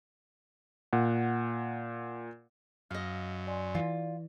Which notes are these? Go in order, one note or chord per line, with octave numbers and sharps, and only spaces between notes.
A#2 F#5
F#2 D#5 F5
D5 G#5 C6
E3 F4 D5